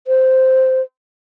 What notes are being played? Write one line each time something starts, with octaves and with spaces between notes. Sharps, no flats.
C5